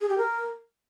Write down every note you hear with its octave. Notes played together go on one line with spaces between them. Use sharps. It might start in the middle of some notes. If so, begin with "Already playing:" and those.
G#4
G4
A#4